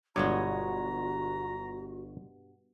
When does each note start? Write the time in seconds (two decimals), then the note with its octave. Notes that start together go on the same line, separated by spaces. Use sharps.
0.16 G1 G2 B2 G#3 F#4 C#5 A#5